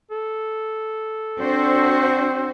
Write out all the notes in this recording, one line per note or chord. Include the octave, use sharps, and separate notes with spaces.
A4
C4 D4 F#4 C5